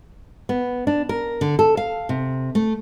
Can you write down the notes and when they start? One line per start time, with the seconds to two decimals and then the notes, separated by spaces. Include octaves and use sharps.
0.49 B3
0.87 D4
1.09 A#4
1.41 D3
1.59 A4
1.77 F5
2.09 C3
2.55 A3